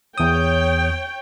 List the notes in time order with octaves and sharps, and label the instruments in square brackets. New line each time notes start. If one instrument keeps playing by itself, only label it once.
[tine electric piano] E2 D#6 [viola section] C#5 G5